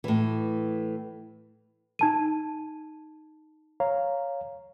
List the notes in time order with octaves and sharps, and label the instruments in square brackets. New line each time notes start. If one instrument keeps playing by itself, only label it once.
[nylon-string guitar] A2 E3
[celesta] D#4 A5 D#7
[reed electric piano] C#5 F5 A#5